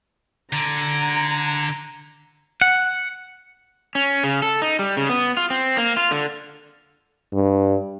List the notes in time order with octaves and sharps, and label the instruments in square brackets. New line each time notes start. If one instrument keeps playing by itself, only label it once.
[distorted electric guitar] D3 [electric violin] A#5 G#6
[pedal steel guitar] F#5
[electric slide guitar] C#4
C#3
A4
D#4
G3
C#3
B3
F4
C4
A#3
F4
D3
[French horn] G2